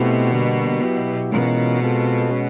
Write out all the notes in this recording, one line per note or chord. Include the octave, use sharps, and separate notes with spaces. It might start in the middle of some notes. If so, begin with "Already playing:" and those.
Already playing: B2 A3 C4 E4 G4
D3 G3 A#3
F#3 B3 E4 G4
B2 E3 G#3 C#4 F4 A#4
G#3 C4 F4 A4
G#3 C#4 F#4